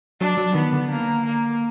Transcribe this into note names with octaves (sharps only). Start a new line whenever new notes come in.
F#3 D4
F#3
D#3 B3
D3
A#3
A#3